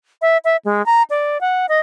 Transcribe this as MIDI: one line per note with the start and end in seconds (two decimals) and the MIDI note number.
0.22 0.37 76
0.44 0.57 76
0.65 0.84 56
0.86 1.03 82
1.10 1.40 74
1.41 1.66 78
1.69 1.80 75